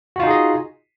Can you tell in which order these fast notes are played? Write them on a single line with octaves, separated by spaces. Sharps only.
F#4 F4 D#4 G#4 D#5